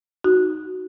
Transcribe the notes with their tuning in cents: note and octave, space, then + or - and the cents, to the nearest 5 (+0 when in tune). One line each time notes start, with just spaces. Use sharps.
D#4 +0 F#4 +0